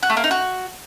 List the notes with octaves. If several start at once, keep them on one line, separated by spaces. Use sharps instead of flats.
F#4
A3
A#3
D#4
F#4